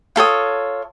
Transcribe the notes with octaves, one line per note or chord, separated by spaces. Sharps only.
F4 A4 C#5 D#6